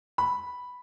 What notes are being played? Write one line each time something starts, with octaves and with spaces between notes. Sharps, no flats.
B5